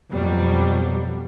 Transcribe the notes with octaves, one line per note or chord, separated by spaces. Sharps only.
F2 B2 F#3 G3